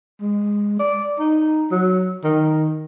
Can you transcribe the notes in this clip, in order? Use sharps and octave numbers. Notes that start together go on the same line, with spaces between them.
G#3
D5
D#4
F#3
D#3